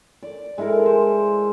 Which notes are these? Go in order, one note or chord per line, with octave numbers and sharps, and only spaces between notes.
D5
G#3 E4 A4 A#4
C5